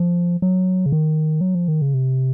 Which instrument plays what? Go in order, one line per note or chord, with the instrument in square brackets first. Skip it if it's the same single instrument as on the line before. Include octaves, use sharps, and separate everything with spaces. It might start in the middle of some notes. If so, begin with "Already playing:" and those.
Already playing: [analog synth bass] F3
F#3
C#3
D#3
F#3
F3
D#3
C#3
C3